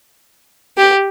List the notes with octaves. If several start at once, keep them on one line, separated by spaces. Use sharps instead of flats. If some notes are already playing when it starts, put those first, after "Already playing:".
G4